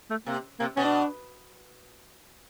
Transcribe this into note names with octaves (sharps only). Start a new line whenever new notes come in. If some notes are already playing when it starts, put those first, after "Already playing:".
A3
C3 A#3
C3 A#3
B2 C#4
D4